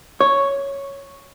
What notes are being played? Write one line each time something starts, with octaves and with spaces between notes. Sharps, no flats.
C#5